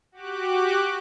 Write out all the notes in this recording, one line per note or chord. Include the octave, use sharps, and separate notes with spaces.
F#4 G4 D6 F#6